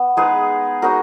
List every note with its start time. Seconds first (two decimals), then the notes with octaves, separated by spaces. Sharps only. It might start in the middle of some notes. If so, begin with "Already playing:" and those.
Already playing: B3
0.17 G#3 D#4 G#4 B4
0.82 G#3 D#4 F#4 A#4